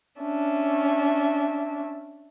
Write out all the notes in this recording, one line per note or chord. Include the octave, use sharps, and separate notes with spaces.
C#4 D4 E5